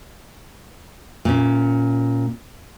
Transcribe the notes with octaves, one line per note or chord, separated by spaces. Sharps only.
A#2 C#4